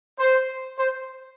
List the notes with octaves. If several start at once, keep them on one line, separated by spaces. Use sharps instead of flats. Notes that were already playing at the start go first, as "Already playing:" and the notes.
C5
C5